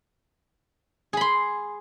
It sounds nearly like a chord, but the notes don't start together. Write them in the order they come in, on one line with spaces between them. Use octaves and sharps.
G#4 B5 C6